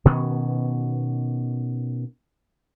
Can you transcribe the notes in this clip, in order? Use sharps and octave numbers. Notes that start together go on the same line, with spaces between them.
B2 D#3 B3 C#4